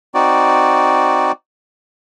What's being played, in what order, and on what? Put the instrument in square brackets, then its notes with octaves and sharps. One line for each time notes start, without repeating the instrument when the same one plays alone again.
[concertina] C4 D#4 F#4 D5